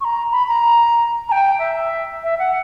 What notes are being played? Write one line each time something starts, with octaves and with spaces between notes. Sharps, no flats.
C#6
A#5
B5
A#5
A#5
G5
E5
E5
F#5